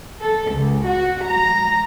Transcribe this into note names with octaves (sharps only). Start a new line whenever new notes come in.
A4
C#2
F#4
A#5